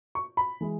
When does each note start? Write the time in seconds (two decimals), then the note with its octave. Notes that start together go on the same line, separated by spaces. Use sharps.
0.15 C#6
0.37 B5
0.61 E3 G#3